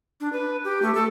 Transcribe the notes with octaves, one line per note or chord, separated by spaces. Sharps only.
D4
B4
G4
A3
A4